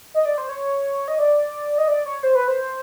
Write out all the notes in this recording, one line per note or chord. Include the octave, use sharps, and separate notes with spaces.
D#5
D5
C5
C#5
D#5
D5
D#5
D5
C#5
C5
B4
C5